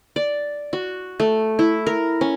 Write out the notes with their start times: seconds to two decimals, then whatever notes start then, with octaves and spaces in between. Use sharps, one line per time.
0.16 D5
0.73 F#4
1.20 A3
1.59 E4
1.87 A#4
2.21 C#4